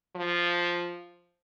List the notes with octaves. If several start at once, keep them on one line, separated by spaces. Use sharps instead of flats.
F3